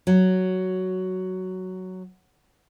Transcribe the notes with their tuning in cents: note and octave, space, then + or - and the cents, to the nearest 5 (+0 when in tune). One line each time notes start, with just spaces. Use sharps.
F#3 +5